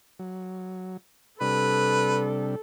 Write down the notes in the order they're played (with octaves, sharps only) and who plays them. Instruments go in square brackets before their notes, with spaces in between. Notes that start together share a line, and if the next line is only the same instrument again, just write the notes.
[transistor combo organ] F#3
[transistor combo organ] C3 G3 D4 [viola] A4 [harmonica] B4